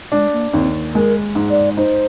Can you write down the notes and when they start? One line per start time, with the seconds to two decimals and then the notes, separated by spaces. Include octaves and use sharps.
0.12 G#3 D4
0.33 A#3
0.53 D#2 C4
0.95 G#3 A#4
1.35 G#2
1.50 D5
1.77 D#4 C5